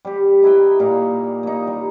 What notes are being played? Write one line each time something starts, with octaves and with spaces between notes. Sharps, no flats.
G3 G4
D#4 E4 B4 G5
A#2 D#4 F5
A#3 D#4
G3